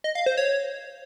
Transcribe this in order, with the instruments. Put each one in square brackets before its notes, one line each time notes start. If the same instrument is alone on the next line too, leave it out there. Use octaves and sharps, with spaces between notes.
[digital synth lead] D#5
F5
C5
C#5